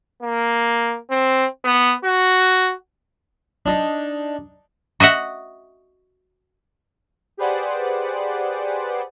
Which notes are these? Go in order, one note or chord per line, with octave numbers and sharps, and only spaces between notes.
A#3
C4
B3
F#4
D4 D#4
F#4 D#5 E5 F#5
G4 G#4 B4 C5 D5 F#5